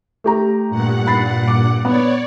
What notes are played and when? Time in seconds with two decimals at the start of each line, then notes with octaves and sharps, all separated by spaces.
0.24 A3 G4 A#5
0.69 G2 A#2 F#5
1.07 B5 A6 C7
1.48 D6
1.85 B3 C#5 D5